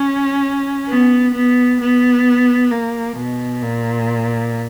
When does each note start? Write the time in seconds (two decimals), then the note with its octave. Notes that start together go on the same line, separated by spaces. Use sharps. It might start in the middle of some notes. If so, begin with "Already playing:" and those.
Already playing: C#4
0.89 B3
1.34 B3
1.80 B3
2.71 A#3
3.17 B2
3.62 A#2